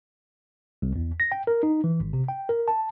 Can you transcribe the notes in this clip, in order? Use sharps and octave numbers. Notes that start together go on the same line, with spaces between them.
C2
E2
A#6
G5
A#4
D#4
E3
G#1
C3
G5
A#4
A5